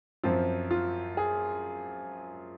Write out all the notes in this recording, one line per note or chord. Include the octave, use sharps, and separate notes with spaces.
F#2 F3 C4 F4
F4
G#4